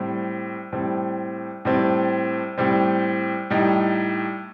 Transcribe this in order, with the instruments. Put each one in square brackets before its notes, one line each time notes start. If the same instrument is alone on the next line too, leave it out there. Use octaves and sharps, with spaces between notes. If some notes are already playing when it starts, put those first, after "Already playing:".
Already playing: [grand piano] A2 G3 C4
A2 G3 C4
A2 G3 C4
A2 G3 C4
A2 G3 D#4